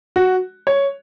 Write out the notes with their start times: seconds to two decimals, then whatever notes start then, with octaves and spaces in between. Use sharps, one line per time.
0.16 F#4
0.67 C#5